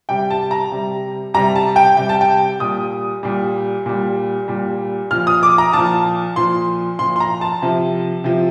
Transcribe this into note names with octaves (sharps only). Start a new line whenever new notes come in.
C3 G3 G5
A5
A#5
C3 G3
C3 G3 A#5
A5
G5
C3 G3 G5
A5
G5
A#2 G3 D#6
A#2 G3
A#2 G3
A#2 G3
A#2 F3 F6
D#6
D6
A#5
A#2 F3 A5
A#2 F3 C6
A#2 F3 C6
C6
A#5
A5
C3 F3
C3 F3